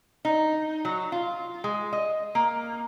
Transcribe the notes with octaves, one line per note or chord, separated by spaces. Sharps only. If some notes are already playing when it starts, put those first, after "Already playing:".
D#4
F#3
F4
G#3
D#5
A#3